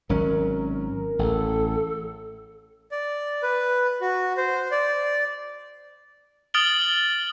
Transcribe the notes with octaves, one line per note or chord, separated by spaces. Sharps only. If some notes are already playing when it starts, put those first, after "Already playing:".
G#1 F#3 C#4 A#4
A1 A4
D5
B4
F#4
C5
D5
D#6 F6 A6 D7 F#7 G7